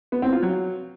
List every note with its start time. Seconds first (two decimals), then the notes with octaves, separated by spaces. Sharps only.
0.12 B3
0.22 C4
0.32 F4
0.42 F#3